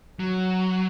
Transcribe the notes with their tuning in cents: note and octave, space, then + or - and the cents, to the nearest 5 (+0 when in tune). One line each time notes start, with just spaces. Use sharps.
F#3 +5